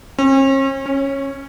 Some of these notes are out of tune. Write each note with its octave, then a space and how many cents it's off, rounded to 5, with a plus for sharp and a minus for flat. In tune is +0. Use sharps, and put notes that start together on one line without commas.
C#4 -45
C#4 -15